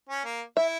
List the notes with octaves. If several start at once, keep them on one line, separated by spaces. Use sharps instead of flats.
C#4
A#3
E4 E5